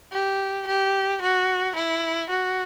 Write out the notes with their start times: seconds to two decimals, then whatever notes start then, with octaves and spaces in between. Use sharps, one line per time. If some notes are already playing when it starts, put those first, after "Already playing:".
0.13 G4
0.67 G4
1.21 F#4
1.76 E4
2.30 F#4